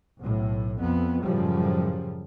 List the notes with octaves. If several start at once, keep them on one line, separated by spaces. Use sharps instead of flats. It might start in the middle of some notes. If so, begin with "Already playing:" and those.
B1 A2
F2 B3
F#2 A2 C#3 F3 G3